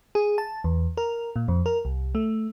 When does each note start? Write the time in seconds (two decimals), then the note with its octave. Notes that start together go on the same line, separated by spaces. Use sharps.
0.15 G#4
0.38 A5
0.64 E2
0.97 A#4
1.36 A#2
1.48 F2
1.66 A#4
1.85 C2
2.15 A3